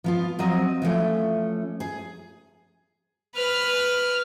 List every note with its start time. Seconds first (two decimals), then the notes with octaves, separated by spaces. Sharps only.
0.04 F3 B3 F4
0.39 F3 F#3 C4 D#5
0.82 E3 F3 A3 C#4
1.80 G#4
3.35 B4 F6